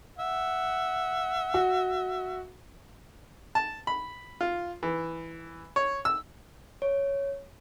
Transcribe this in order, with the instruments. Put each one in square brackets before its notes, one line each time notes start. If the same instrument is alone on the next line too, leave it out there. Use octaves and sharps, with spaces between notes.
[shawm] E5 [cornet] F#5
[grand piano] F#4
[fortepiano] A5
B5
F4
E3
C#5
E6
[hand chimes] C#5